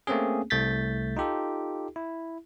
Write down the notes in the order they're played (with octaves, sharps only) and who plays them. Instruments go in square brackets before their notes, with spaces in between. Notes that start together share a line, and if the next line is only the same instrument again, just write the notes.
[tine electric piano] A3 A#3 C4 C#4 G#4
C2 A3 G6 A6 B6
D#4 F4 G4 A4
E4